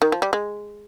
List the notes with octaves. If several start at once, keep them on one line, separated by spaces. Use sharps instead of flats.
D#3
F3
G3
G#3